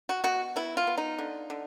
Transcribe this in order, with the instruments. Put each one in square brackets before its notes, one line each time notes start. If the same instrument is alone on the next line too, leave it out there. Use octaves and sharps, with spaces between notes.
[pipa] F#4
B2 F#4
B3 E4
F4
B3
D#4
D3
D3